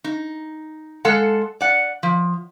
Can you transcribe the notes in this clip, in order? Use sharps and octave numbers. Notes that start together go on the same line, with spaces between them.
D#4
G#3 A4 F5 F#5
D5 F#5
F3